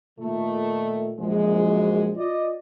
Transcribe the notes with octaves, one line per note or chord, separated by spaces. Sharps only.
A#2 D#3 A3
A#1 F#2 G#3
F4 D5 D#5